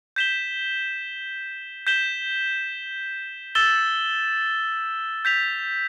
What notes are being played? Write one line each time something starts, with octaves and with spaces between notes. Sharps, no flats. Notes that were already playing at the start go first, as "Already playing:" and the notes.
G6 B6 E7 G7
G6 B6 E7 G7
E6 A6 E7 G7
G6 B6 F7